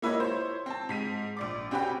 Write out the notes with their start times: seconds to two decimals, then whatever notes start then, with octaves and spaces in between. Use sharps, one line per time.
0.02 A#3 E4 B4 C#5 D#5
0.20 C5 C#5
0.66 C4 A5
0.89 G#2 B6 D#7
1.37 A#1 D5 D6
1.71 C4 C#4 F#4 G4 B4 G5